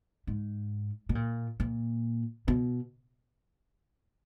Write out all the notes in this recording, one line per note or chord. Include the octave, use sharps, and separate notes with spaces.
G#2
B2
A#2
A#2
B2